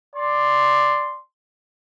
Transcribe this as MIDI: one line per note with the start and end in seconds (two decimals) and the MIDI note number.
0.16 1.19 74
0.16 1.19 84